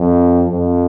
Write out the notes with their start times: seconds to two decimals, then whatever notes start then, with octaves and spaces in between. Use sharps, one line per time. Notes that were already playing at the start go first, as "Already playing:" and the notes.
Already playing: F2
0.49 F2